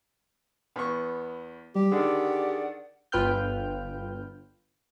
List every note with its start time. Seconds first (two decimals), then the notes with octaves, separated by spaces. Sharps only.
0.76 E2 B3 C#6
1.75 G3 G4
1.92 D3 D#3 G#4 D5 F#5
3.12 G1 F4 B4 G5 F6 G6